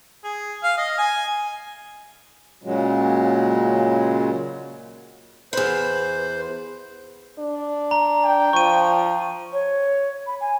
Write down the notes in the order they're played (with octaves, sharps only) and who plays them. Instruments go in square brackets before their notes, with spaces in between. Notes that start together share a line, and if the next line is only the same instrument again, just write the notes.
[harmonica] G#4
F5
D#5
G#5
[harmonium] A#2 C#3 F#3 G#3
[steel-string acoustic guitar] E2 B4 [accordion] C5
[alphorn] D4
[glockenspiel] A#5
[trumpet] G5
[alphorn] F3 [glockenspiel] C#6 D#7
[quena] C#5
B5
G#5